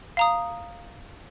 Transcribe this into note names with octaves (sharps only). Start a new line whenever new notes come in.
F5 A#5 D#6